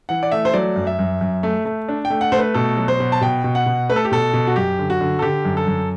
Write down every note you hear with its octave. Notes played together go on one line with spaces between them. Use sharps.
E3 F#5
D5
A3 E5
C5
F#3 D5
F#2
E5
F#2
F#2
A3
A3
D4
G5
A3
F#5
A3 C5
B4
B2 A4
F#3
C5
B2
A5
B2 G5
B2
F#5
B2
A3 B4
A4
G4
B2 A4
B2
F#4
F#2 G4
D3
F#4
D3
A4
D3 G4
F#2
A4
F#2